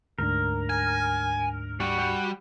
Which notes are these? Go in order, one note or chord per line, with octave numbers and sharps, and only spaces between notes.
D2 G#2 D4 A#4
G#5
G3 F#4
G3